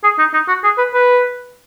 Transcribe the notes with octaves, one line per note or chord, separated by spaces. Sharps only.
G#4
D#4
D#4
F#4
G#4
B4
B4